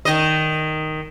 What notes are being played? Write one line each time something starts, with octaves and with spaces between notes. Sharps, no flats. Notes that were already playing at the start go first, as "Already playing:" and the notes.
D#3 D#5